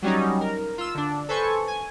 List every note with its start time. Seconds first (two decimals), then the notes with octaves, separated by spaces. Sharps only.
0.02 F#3 G3 C#4 D#4
0.41 A#4
0.78 F4 E6
0.94 D3 D4
1.29 A4 B4 C5 G#5 C#6
1.68 G#5